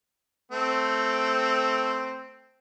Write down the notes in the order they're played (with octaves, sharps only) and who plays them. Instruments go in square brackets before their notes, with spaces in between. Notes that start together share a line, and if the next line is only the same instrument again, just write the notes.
[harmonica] A3 C4